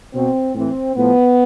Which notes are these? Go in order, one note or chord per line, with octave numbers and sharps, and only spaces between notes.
B2 C4
A2 E3 C4
A2 F3 B3